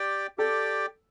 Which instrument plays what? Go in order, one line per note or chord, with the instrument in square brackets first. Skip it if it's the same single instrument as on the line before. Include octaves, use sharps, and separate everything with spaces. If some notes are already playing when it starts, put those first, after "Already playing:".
Already playing: [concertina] G4 D5 G5
[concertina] G4 D5 G5 [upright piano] A4